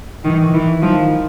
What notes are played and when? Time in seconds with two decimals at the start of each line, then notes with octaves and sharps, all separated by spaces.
0.25 D#3 E3
0.54 E3
0.82 D#3 F3